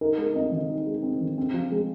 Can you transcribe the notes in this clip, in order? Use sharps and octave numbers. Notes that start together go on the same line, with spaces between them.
D#4 A#4
G#3 A#4
C4 D#5
D#3 D#5
D#4
G#3
C4
D#3
C4
F3
G#3